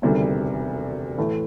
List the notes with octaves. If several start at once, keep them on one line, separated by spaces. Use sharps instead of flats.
E1 D2 C3 D#3 G3
A2 E3 A3